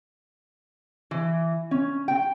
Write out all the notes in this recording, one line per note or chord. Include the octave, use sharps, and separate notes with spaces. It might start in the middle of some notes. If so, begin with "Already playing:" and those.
E3
C#4
G5